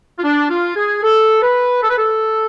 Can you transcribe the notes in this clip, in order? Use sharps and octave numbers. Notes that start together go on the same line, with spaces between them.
F4
D4
F4
G#4
A4
B4
A4
B4
A4